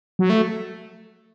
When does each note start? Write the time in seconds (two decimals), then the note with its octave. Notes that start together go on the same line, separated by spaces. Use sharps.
0.19 F#3
0.30 A3